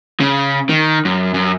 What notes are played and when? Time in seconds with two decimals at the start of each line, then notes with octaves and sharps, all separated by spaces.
0.20 C#3
0.69 D#3
1.05 F#2
1.34 F#2